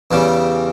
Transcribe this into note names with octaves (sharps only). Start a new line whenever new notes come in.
E2 C#3 G3